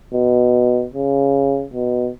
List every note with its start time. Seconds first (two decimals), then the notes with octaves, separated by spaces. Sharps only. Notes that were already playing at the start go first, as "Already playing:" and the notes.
0.13 B2
0.93 C#3
1.73 B2